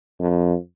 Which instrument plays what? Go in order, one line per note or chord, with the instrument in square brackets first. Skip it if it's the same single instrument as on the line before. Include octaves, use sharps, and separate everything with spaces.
[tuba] F2